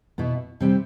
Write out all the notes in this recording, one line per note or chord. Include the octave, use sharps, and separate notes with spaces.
B2 B3 E4
C3 G3 C4 G4